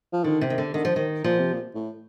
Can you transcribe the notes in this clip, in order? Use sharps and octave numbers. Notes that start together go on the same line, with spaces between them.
F3
D3 D#3
C3
D#3
D3
D3 D#3
F3
D#3
A#2 F3
C3
A#2
A2